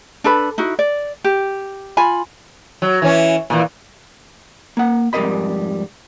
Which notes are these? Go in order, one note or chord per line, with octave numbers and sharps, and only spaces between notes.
D4 A4 B4 B5
D#4 E4 F#4
D5
G4
F4 G#5 B5
F#3
E3 C#4
A#2 E3
A#3 F#5
F2 G#2 G3 A#4 D#5 B5